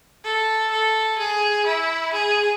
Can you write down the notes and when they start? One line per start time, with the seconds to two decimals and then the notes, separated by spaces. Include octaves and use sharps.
0.25 A4
0.72 A4
1.19 G#4
1.66 E4
2.13 G#4